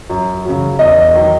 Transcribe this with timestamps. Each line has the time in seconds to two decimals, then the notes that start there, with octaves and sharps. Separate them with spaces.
0.10 F#2
0.45 C#3 F#3
0.79 E2 D#5
1.14 D#3 F#3